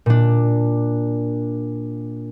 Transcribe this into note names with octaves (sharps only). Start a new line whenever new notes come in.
A#2 D4